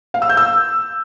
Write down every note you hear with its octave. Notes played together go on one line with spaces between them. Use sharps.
F5
E6
G6
E6